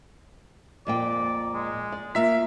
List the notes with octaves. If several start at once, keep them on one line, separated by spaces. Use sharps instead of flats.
F2 A#2 D5 G5
G#3
D5
A#3 F4 A#4 E5 B6